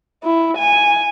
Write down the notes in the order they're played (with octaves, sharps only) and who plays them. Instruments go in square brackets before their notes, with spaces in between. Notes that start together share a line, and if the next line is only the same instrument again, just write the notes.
[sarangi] E4
G#5